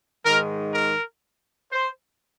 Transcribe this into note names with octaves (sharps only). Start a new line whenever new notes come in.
G#2 D#3 G#3 A#4
A#4
C5